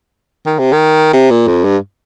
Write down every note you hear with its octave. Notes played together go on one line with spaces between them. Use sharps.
D#3
C3
D#3
C3
A#2
F2
G2